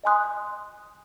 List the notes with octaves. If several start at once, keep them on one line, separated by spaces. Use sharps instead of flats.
D#5 G#5 C6 D#6 F#6